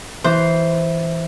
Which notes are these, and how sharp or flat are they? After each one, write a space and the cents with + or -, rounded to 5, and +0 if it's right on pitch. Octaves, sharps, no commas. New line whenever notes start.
E3 +0 C5 +0